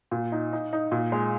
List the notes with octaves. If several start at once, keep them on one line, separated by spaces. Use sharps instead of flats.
A#2
D#4
D#4
D#4
A#2
G#3